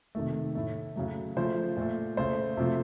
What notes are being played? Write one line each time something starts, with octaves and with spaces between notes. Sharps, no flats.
C3 D#3 A3
A2 A3
C#3 F#3 A3
C#3 F3 A3 C5
A#2 A3
C#3 A3 C5
C3 F3 A3